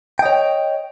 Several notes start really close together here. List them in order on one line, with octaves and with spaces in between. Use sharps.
G5 D#5 C#5